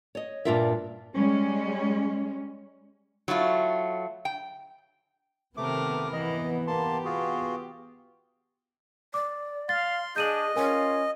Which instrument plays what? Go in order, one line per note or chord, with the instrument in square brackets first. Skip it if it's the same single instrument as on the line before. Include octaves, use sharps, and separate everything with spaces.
[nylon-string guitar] C#5 D#5
G2 A#2 D4 F4 A#4 E5
[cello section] G3 G#3 C#4
[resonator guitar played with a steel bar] F#3 A3 E4 F4
G5
[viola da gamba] C3 D#3 A#4 [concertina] A3 D6 [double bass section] B3
[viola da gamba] E3 [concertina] D#5
[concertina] A#3 A5 C6 [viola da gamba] G4
[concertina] F4 F#4 G#4
[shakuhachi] D5 [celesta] D6
[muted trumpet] F5 [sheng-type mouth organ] C6 [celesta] A6
[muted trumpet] D4 [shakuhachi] G#4 [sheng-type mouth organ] D#5 [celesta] G6 D#7 F#7
[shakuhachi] C#4 [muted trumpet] F4 [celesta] A#4 G#5